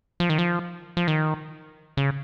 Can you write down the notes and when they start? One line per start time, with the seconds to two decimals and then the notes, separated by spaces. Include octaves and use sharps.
0.20 F3
0.30 D#3
0.38 F3
0.97 F3
1.08 D#3
1.97 C#3